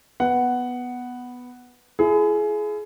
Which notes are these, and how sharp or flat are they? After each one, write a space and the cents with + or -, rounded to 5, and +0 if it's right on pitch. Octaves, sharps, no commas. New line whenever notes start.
B3 +0 F#5 +5
E4 +40 G#4 +25